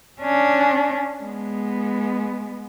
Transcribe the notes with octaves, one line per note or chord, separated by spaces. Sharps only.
C#4 D4
G#3 B3